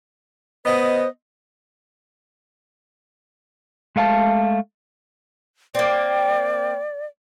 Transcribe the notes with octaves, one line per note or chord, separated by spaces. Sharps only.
B3 C5 D#5
G#3 A3 F5 G#5 A5
A#3 C4 D5